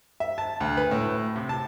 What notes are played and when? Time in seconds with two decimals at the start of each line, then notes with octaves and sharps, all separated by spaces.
0.20 E5
0.38 A5
0.60 D2
0.77 B4
0.91 A2
1.36 C3
1.49 A5